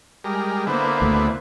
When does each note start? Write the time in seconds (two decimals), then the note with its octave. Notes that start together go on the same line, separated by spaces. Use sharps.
0.24 G3 G#3 A#4
0.67 D3 A#3 B3 E4 C5
1.02 D2